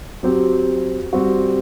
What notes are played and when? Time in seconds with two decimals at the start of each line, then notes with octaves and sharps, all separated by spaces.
0.23 F#3 C4 G4
1.13 G3 C4 F#4